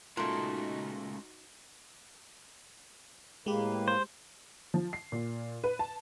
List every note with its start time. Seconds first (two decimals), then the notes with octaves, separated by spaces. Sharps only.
0.17 A#2 G#3 A3 C#4 D#4 F4 F#4
3.46 A2 G#3 A#3 G4 B4
3.88 C5
4.74 F3
4.93 C7
5.12 A#2
5.64 B4
5.79 A5